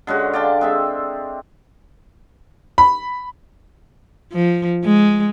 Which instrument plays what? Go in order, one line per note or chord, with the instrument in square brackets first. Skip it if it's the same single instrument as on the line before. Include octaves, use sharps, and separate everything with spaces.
[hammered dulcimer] D3 G#3 C#4 F#4
D5 F5 G5 A5
G#3 C4 E5
[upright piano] B5
[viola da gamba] F3
G#3